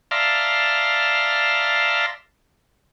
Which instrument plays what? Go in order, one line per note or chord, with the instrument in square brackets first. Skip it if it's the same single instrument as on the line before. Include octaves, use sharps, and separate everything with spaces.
[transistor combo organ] D5 E5 F5 A5 A#5 C6